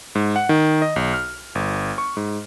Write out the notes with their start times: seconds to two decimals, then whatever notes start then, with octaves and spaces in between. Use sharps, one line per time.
0.15 G#2
0.36 F#5
0.49 D#3
0.82 D#5
0.96 B1
1.14 F6
1.55 G1
1.98 C#6
2.17 G#2